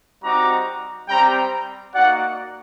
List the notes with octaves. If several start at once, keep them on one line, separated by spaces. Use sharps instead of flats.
G3 C4 D#4 F#4 A#5 D6
G3 C4 G4 G5 A#5
A#3 D#4 F#4 D5 F#5